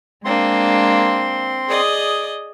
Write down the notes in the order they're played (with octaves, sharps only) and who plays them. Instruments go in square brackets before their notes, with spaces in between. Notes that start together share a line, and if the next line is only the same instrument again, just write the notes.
[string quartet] G#3 A#3 D4 [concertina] C4 C6
[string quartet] G#4 D5 D#5